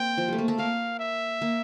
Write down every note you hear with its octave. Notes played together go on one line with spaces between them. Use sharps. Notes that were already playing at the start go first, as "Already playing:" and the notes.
Already playing: A#3 C4 G5
F3
G3 A3
A#3
A3 A4
A#3 A#4 F5
E5
A#3 A#4